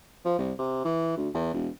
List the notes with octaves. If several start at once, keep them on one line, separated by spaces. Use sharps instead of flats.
F3
C2
C3
E3
D2
E2
E1